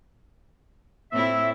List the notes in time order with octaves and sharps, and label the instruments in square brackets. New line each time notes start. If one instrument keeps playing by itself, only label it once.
[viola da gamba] A2 C4 E4 [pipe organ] E5